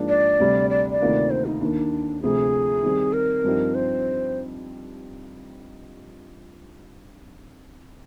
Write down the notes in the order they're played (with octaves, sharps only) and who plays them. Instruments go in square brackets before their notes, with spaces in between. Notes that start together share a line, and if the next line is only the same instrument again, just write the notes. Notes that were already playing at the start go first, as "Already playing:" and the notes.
Already playing: [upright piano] G#2 F3 A#3 D4
[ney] D5
[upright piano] D2 C3 G3
[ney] D5
D5
[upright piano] D2 C3 D#3 A#3 F4
[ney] C5
D#4
[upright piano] D#2 D#3 A#3 [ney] D4
[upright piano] D2 C3 F3 [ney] G#4
[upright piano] D#3 G3 C4
[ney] A#4
[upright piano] G2 F3 C4 D#4 G4
[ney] C5